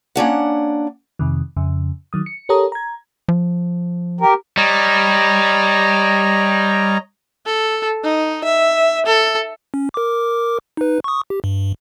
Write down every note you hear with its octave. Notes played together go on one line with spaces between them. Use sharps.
A#3 C#4 D4 F#5
F2 C3 D#3
F2 C#3
D#3 F#3 D#6
C#7
G4 A4 A#4 C#5 A#5 D#6
A#5 G#6
F3
G4 A#4
G3 C#5 D#5 A#5
A4
D#4
E5
A4
C#4
A#4 D6
D#4 B4
C#6 D#6
G4
G2